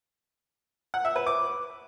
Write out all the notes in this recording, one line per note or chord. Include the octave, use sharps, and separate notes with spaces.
F#5
E5
B4
D6